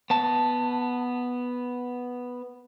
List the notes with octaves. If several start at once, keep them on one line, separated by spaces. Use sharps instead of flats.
B3 A5